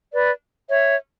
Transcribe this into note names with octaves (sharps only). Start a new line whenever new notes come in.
B4 D5
C#5 E5